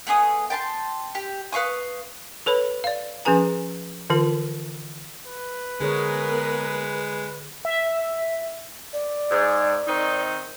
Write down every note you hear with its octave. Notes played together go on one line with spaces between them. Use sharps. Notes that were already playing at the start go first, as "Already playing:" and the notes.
A3 B3 G#4 D#6
G5 A5 B5 C6
G4
B4 F5 C#6 D#6
A4 B4 C#5 B5
D5 F5
F3 C#4 G#4 B4 G#5 A#5
D3 E3 F4 A#4
B4
D3 G#3 B3 G#4 A#4 C#5
E5
D5
G#2
D#3 C4 D#4